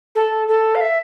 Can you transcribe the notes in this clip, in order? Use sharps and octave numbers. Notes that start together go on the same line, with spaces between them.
A4
A4
F5
E5